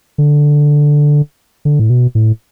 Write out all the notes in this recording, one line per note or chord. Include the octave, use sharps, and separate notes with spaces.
D3
D3
A2
B2
A2